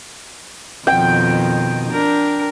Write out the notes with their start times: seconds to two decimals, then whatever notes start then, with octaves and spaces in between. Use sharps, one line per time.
0.87 F2 B2 D#3 G5
1.91 D4 A#4